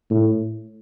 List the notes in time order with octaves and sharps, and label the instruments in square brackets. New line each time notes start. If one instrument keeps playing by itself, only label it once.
[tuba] A2